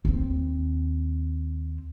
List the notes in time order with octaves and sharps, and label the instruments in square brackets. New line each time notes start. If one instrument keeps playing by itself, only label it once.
[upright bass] D#2 C4